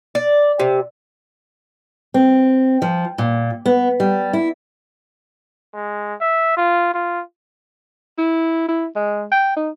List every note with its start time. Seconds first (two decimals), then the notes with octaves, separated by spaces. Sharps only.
0.15 D5
0.60 C3
2.14 C4
2.82 F3
3.18 A#2
3.66 B3
4.00 G3
4.33 E4
5.74 G#3
6.21 E5
6.57 F4
6.94 F4
8.18 E4
8.68 E4
8.96 G#3
9.32 G5
9.56 D#4